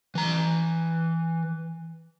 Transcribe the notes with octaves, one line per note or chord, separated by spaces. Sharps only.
E3 A#5